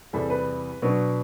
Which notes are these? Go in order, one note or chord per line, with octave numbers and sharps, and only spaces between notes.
E2 C3 E3 G3 A4
B4
B2 F#3 B3 D4